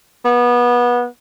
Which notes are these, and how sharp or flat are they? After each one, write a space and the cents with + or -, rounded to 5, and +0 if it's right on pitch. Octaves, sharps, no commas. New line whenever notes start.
B3 -25